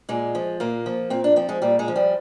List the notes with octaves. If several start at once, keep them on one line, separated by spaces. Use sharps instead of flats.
A#2 G#3
F3
A#2 A#3
F3
A#2 C4
D4
F3 C4
G#3
A#2 G3
G#3
F3
G3